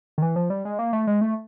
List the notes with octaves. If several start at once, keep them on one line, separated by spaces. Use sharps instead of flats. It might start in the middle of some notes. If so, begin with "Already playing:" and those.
D#3
E3
F3
G3
G#3
A#3
A3
G#3
A3